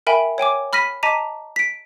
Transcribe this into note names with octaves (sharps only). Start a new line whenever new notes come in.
A#4 E5 G5 G#5 B5
C#5 G5 G#5 D6
B5 F6 A#6 B6 D#7
D#5 A5 A#5 D6 B6 D#7
B6 D7